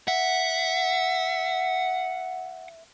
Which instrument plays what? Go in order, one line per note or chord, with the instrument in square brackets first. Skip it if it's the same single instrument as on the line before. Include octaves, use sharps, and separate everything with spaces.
[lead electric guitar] E5 [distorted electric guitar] F#5